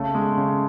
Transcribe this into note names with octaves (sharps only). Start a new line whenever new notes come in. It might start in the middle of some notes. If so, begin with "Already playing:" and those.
Already playing: C#3 A3
G#3
C#3